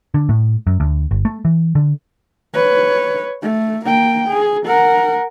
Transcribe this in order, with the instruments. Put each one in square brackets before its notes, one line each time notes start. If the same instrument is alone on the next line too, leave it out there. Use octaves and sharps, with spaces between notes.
[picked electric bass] D3
A2
F#2
D2
G1
A3
E3
D3
[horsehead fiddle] B4 C#5
A3
A#3 G5
G#4
A#4 F#5